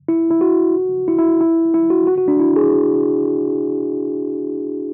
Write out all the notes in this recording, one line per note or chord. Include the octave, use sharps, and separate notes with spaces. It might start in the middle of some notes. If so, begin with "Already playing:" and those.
E4
E4
F#4
E4
E4
E4
E4
F#4
F#4
F#4
D4
E4
G#4